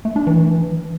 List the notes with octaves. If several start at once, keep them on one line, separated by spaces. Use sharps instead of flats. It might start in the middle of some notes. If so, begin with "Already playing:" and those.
A3
D4
E3